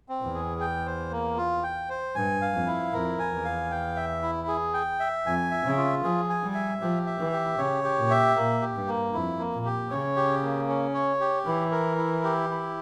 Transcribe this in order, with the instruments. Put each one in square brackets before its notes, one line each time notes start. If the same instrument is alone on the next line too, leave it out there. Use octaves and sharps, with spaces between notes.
[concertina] C4
[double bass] E2
[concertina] G#4
G5
C5
A#3
F4
G5
C5
[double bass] G2 [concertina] G#5
[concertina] F5
[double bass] F2
[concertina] E4
[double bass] F2 [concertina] A#4
[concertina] G#5
[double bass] E2
[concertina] F5
G5
E5
E4
G#4
G5
E5
[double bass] F2 [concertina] G#5
[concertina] E5
[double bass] C#3
[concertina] F4
[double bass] F3 [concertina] G#4
[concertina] G#5
[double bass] G3
[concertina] E5
[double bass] F3 [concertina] G4
[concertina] E5
[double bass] E3
[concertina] G4
[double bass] C#3 [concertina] C#5
[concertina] G4
[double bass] A#2
[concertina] E5
[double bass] A#2 [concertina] A#3
[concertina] G4
[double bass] G2
[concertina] A#3
[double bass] F2 [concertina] E4
[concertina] A#3
[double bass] A#2
[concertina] G4
[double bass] C#3 [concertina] C#5
[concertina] G4
A#3
C#4
C#5
G4
[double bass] E3 [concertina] E4
[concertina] A#4
E4
G4
E4